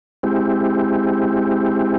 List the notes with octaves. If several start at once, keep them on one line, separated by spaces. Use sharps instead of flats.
G#3 C4 E4 G4